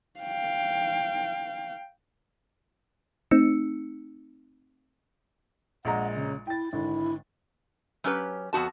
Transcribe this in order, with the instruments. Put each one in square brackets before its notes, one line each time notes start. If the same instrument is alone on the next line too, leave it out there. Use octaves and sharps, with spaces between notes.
[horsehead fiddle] F5 G5
[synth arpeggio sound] A3 C4 D#4 E6 C#7
[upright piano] A#1 G#3 A#5 [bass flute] F#5
[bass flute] C#3
[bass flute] E4 [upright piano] G5 A6
[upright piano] G#1 D3 [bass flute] E4
[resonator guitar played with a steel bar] F#3 C#4 G4 B4
F2 B3 F#4 A5